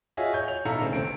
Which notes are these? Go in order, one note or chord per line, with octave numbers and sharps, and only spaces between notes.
F4 F#4 G#4 C#5 D#5 E5
C#5 G6
F7
B1 E4 A4 F5 A#5 C#7
C#3 A3 C4
G1 C4 D7